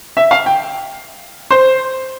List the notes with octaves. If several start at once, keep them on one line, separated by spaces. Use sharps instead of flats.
E5
F5
G5
C5